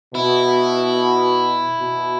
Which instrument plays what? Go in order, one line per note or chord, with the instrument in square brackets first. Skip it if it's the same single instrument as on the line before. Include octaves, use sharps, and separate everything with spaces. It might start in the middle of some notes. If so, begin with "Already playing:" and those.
[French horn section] B2 [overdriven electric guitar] E4
[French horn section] B2